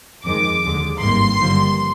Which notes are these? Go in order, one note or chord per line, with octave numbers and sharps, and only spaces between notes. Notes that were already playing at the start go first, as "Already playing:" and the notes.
F2 D#3 G#3 D6
D#2 D3 G#3
G#1 G2 D#3 A#3 C6
G2 D3 F3 A#3